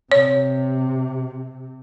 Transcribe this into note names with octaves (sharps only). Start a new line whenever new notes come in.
C3 C#5